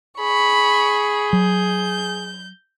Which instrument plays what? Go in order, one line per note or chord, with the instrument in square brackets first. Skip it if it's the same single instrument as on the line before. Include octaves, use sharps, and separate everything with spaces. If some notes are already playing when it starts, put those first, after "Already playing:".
[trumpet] G#4 [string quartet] B5 C#6
[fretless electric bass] F#3 [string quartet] G6